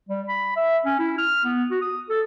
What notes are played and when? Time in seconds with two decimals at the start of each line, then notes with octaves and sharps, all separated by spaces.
0.09 G3
0.28 B5
0.56 E5
0.86 C#4
0.99 E4
1.18 F6
1.44 B3
1.71 F#4
1.82 D#6
2.09 A4